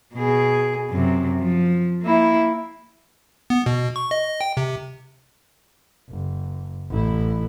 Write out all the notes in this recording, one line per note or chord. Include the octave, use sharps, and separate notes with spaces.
B2 G#4
F#2 C3
F3
A#3 E4
B3
B2
C#6
D#5
G5
C3
F#1
A1 E4